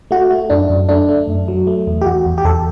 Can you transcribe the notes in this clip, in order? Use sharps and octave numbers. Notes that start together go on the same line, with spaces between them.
A3 F#4
A3
F#2 D4
F#2
A3 D4
A3
F#2
F#3
A3
E2
G4
E2 F#4
E2
G4
E2 A4